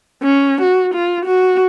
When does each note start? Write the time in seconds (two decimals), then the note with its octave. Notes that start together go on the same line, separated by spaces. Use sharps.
0.22 C#4
0.61 F#4
0.94 F4
1.26 F#4